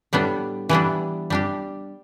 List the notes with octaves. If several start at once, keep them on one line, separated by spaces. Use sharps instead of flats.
A2 G3 B3 D4
E3 G3 B3 D4
G3 D4 G4